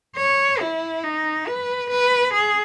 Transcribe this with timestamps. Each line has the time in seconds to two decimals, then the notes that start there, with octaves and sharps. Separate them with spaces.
0.16 C#5
0.60 E4
1.04 D#4
1.47 B4
1.91 B4
2.34 G#4